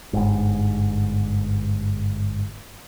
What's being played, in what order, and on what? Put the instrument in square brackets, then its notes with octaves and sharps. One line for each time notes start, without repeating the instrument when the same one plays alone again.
[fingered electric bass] G1 G#2